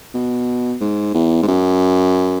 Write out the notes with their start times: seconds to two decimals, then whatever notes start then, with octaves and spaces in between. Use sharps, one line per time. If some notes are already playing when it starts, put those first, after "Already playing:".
0.14 B2
0.81 G#2
1.14 E2
1.42 G#2
1.47 F#2